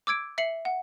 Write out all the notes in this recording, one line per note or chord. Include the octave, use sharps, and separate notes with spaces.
D6 E6 G#6 D7
E5 C7 C#7 F#7
F#5